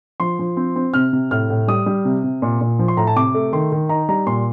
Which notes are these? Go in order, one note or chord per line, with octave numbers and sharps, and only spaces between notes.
F3 C6
F3
C4
C4
C3 F6
C3
A2 F6
A2
G3 D#6
G3
C3
C3
A#2
A#2
F3
C6
A2 A#5
A5
C3 D6
A3
D#3 C6
D#3
D#4 A#5
G3 A#5
A#2 C6